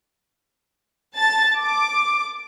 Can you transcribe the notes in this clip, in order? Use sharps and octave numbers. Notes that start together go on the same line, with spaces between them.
A5 A6
D6